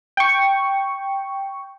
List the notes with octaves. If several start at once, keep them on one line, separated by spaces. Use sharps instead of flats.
G5 C#6